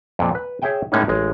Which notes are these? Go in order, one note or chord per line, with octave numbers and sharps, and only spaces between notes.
F2 A#2
B4
G#4 C#5 E5 G5 G#5
A2 G#3 A#3 C#4 D#4
A1 G#3